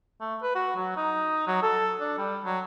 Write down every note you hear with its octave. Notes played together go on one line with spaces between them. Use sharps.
A3
B4
F#4
F#3
D#4
F#3
A4
D4
G3
F#3